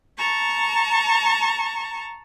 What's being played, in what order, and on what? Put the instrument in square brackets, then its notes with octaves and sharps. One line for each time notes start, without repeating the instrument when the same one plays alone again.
[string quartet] A5 A#5 C#6